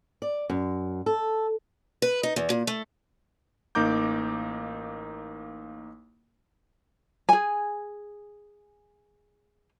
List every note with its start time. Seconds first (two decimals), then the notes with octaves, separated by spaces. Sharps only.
0.22 D5
0.50 F#2
1.06 A4
2.02 B4
2.23 D#4
2.36 E2
2.50 A#2
2.67 A3
3.75 A1 A#3 D#4 A#5 D6 G6
7.29 G#4 G#5